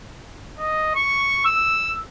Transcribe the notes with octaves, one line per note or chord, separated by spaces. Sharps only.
D#5
C#6
E6